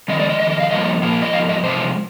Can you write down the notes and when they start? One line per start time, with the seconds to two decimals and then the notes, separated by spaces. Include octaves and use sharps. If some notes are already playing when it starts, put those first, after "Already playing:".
0.08 F2 D#3 G#3 D#5
0.20 D5
0.29 D#5
0.40 F2 D#3 D#5
0.51 D#5
0.60 F5
0.71 G2 F3 A#3 D#5
1.03 A#2 F3 A#3
1.22 D#5
1.32 G#2 F3 F5
1.49 D#5
1.64 C3 F3 G#3 C5